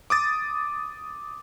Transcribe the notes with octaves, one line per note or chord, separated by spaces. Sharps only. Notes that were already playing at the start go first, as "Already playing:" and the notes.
D6 D#6 A6